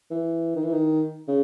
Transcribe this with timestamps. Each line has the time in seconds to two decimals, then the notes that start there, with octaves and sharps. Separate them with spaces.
0.11 E3
0.56 D#3
0.64 E3
0.73 D#3
1.28 C#3